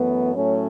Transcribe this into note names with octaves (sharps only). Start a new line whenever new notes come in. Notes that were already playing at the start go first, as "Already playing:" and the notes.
Already playing: F#2 E3 A3 B3
A2 F#3 A3 C#4